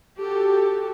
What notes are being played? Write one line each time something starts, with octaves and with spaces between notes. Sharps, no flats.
F#4 G4 A4